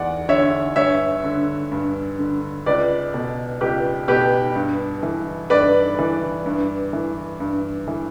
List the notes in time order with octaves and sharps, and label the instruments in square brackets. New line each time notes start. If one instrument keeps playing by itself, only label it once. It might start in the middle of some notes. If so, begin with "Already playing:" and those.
Already playing: [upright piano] E2 D5 F#5
D3 C#5 E5
G2 C#5 E5
D3
G2
D3
C#2 B4 D5
B2
C#2 G4 B4
B2 G4 B4
G2
E3
G2 B4 D5
E3
G2
E3
G2
E3